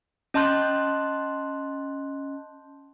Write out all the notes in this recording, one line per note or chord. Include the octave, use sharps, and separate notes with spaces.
C#4 D#5 A5 C6 F#6 G6